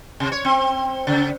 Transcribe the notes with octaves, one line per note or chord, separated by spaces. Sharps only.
C3
C#5
C4
C#3